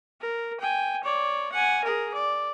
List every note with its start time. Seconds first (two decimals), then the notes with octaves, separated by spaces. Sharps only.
0.21 A#4
0.60 G5 G#5
1.03 C#5 D5
1.53 F#5 G#5
1.84 G#4 A#4
2.14 D5